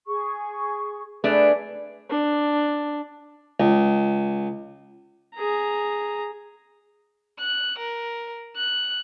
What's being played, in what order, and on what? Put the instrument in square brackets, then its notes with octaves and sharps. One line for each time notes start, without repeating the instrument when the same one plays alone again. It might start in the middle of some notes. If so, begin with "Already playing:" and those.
[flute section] G#4 C#6
[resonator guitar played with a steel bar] A3 D4 [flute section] G#4 B4
[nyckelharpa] D4
[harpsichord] C#2
[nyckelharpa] G#4 A#5
[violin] F#6
A#4
F#6